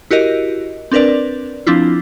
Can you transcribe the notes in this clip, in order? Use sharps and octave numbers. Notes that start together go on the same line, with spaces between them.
E4 F#4 G4 A#4 D#5
C4 D4 A#4 B4 D5
F3 C4 D4 E4 F4